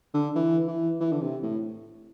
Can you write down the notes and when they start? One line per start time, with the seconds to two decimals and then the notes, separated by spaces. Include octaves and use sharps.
0.14 D3
0.35 E3
0.68 E3
1.00 E3
1.12 D3
1.21 C3
1.42 A2